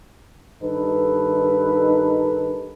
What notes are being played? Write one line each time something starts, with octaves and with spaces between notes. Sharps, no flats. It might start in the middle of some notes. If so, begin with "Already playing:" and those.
G2 D#3 D#4 A4 B4